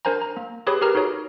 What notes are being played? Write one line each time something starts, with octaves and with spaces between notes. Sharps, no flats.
D4 A#4 C5 G#5 A#5
A#5
A#3
G4 G#4 B4 C#5 B5 D#6
G4 G#4 A#4 B4 A#5 F6
D#4 F#4 G#4 C#5